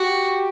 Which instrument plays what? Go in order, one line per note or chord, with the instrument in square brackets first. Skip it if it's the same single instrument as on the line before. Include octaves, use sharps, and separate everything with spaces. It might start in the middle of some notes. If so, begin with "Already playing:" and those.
Already playing: [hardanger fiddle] F#4 [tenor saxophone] G4